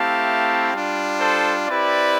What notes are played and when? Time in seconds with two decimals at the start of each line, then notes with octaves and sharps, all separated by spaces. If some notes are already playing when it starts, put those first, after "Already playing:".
Already playing: A3 C4 E4 G4 F5 A5
0.73 G3 D4 F4
1.20 A4 C5
1.69 C4 E4 G4 B4 D5